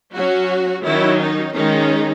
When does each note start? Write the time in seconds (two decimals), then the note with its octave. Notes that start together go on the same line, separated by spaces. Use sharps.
0.15 F#3 C#4 F#4
0.85 D#3 F#3 C#4 E4
1.20 D#4
1.55 D#3 G#3 C#4 D#4